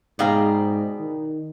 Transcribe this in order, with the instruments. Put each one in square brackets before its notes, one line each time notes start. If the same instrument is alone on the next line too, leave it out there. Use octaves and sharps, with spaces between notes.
[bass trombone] G#2 [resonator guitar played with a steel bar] B2 G#4 F5 [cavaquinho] D5 G5 A#5
[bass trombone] D#3